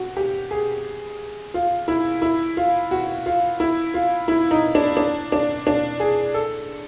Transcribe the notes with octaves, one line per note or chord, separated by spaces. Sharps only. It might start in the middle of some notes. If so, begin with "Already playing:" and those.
Already playing: F#4
G4
G#4
F4
E4
E4
F4
F#4
F4
E4
F4
E4
D#4
D4
D4
D4
D4
G#4
A4